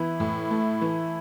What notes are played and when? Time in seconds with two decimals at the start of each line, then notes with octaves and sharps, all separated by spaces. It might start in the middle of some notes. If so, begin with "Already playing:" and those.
Already playing: E3 B3 E4
0.20 A2
0.50 A3
0.81 E3